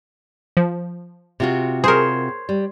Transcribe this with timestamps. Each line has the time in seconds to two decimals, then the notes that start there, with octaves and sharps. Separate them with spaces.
0.57 F3
1.40 C3 F4 F#4
1.84 G#4 A#4 C5 C#5
2.49 G3